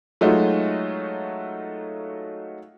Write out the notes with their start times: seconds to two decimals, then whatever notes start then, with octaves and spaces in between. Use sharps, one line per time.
0.21 F#3 G#3 A3 D#4 F4 F#4